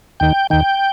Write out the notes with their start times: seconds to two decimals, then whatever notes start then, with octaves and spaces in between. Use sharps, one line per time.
0.20 D#2 D#3 G5
0.50 D#2 D#3 G5